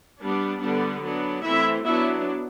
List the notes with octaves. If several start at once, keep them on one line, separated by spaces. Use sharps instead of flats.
G3 B3 D4
D3 G3 B3 D4
F#3 B3 D4
E3 A3 C4 E4 E5
F#3 B3 D4 E4 E5